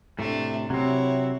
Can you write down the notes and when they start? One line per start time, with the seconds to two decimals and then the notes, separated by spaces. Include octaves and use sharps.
0.19 A2 C3 A3 D4
0.70 C3 F#3 C4 E4 C#5